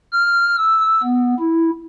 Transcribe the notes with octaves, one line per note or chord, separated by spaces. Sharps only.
F6
E6
B3
E4